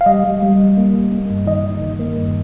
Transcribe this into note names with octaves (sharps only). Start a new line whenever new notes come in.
F5
G3 D#5
G3
G3
G3
A#3
G3
A#3
G2
D#3 D#5
D#3
D#3
A#3
G2